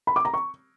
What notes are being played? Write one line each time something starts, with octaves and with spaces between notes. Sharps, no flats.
B5
D6
A#5
C#6